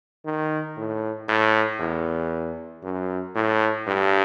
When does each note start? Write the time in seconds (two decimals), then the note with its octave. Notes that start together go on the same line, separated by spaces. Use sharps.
0.25 D#3
0.77 A2
1.29 A2
1.80 E2
2.83 F#2
3.35 A2
3.87 G2